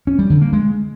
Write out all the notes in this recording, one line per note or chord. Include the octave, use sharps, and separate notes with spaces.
C#4
G3
D3
A#3
G#3